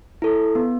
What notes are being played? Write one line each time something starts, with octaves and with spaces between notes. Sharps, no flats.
E4 A4
B3